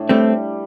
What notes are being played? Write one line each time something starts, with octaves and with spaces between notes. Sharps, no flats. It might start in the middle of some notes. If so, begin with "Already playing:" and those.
Already playing: A2 D4
G3 A3 C4